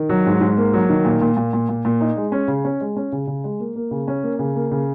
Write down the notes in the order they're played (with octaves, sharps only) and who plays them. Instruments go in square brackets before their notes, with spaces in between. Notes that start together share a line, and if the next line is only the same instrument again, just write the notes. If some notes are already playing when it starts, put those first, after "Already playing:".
Already playing: [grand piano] D#3
F#3
G#2
G#2
A#3
F#3
D#3
A#2
A#2
A#2
A#2
A#2
A#2
D#4
G#3
C#4
C#3
C#4
G#3
C#4
C#3
C#3
G#3
A#3
A#3
C#3
C#4
A#3
C#3
A#3
C#3